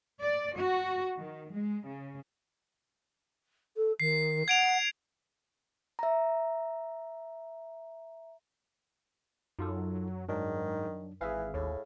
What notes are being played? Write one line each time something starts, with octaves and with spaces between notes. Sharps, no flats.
D5
F#4
D#3
G#3
C#3
A4
D#3 C7
F#5 G#6 D7 F7
E5 A#5
F#2 F#3 D#4 F4 A4
G#2 D#3 F#3 D4
G#1 E3 G#4 E5 F5
D#2 A2